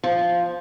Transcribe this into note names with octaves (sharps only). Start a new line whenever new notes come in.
F3